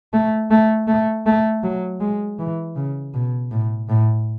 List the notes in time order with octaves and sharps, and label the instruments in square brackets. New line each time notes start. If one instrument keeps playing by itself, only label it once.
[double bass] A3
A3
A3
A3
F#3
G#3
E3
C#3
B2
A2
A2